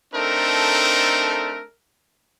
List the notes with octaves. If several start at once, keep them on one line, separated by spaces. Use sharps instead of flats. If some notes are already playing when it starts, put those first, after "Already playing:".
A3 C4 D4 D#4 A4 A#4